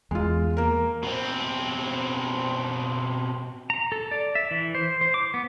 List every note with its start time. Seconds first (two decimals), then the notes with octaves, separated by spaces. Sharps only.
0.11 E2 G#3 F4
0.57 A#3 A#4
1.03 B2 C4
3.70 A#5
3.92 A4
4.11 D5
4.35 E5
4.51 E3
4.75 C5
5.01 C5
5.14 D6
5.34 B3